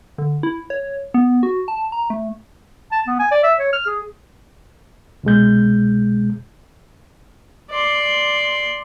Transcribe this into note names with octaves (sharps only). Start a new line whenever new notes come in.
D3
E4
C#5
B3
F#4
A5
A#5
A3
A5
B3
G#5
D5
E5
C#5
F6
G#4
C2 B2 G#3 G6
D5 C6